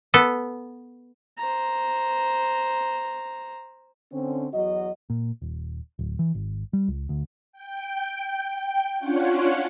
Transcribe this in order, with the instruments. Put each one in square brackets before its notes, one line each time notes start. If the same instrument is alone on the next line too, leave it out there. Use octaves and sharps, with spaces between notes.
[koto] B3 A4
[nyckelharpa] C5 A#5
[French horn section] D3 C4 C#4
E2 F#3 F#4 D#5
[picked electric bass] A#2
D#1
D1
E3
G#1
G3
C#2
D2
[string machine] G5
C#4 D4 F4 C#5 F#5